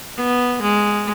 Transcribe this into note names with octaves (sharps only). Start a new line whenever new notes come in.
B3
G#3